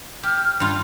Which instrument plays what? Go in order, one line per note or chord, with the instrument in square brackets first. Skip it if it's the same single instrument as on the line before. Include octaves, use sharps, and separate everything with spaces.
[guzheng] G4 [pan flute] F6
[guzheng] G2 F4